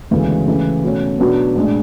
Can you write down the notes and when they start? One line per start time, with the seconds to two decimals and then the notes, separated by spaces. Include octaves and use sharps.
0.11 D2 C#3 E3 G#3 B3
0.47 C#3 E3 A3
0.83 B2 A3 C#4
1.19 B2 F#3 B3 D4
1.56 A2 G#3 D4